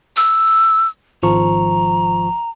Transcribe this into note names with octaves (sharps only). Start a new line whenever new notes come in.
E6
G#1 F3 A#5 C#6